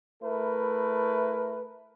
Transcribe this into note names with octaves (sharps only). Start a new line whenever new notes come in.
A3 E4 A#4 B4